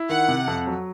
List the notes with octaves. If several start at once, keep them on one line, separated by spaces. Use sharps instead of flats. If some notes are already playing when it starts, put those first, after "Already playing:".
Already playing: E4
D#3 F#5
C3
F2
F#3